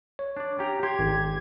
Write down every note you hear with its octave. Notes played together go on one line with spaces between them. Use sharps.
C#5
D4 D5
C#4 G4 A#5
G4 C6 G#6
G#1